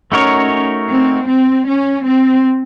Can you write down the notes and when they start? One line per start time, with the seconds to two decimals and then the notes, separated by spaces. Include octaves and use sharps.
0.12 A3 C#4 D#4 F#4 A#4 C#5
0.88 C4
1.27 C4
1.66 C#4
2.04 C4